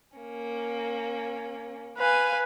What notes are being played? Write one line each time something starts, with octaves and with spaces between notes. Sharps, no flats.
A#3 C#4
B4 F5 G#5